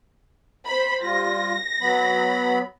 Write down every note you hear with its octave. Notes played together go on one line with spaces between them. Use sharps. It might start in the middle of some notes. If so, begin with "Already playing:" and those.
C5 B5
G3 F4 A#6
F#3 B3 B5